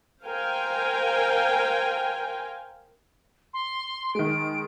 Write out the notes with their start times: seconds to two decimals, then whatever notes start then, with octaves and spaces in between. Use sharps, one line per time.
0.23 A#4 C5 F5 G5 G#5
3.54 C6
4.15 D#3 G#3 D7